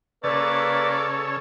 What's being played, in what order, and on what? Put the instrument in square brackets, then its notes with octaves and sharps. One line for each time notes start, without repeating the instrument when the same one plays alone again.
[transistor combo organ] C#3 A4 C#5 [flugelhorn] A#3 [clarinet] B4 [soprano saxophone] D5